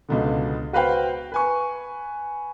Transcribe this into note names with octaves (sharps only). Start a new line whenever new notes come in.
C#2 B2 D3
F#4 B4 C5 F5 G5
B4 G#5 C#6